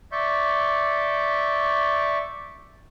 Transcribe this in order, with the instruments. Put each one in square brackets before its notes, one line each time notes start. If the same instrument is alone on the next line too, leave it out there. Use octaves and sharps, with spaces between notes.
[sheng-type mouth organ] D5 E5 C#6 G6